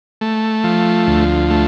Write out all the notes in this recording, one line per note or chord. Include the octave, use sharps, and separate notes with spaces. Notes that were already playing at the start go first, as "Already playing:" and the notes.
A3
F3
D2
A3